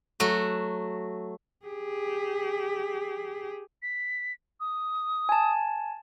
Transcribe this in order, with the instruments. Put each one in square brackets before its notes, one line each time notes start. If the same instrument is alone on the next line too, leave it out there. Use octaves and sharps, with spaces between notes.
[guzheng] F#3 A3 F#4
[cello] G4 G#4
[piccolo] B6
D#6
[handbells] G#5 A5